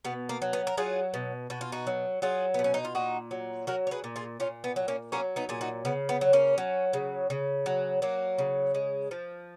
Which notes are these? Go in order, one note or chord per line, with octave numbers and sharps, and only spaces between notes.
B2 B3
A#3
F#3
B3
A#4
F#3 F4 G#4
B2
B2 F#4
F4
D#4 F#4
F#3
F#3 F4 G#4
B3
B2
C#4
D#4
F4
A#2 D#4 F#4
F#3
F#3 F#4 A#4
C#5
G#4 B4
A#2
F4 G#4
A#2 C#4 F4
B3
F#3
A#3 C#4
F#3 A#3 C#4
B3 D#4
A#2 G#4
D#4 F#4
C#3 B3
B3
F#3
A#3 C#4
F#3
C#3
C#3
F#3
F#3 A#3
C#3
G#3
F3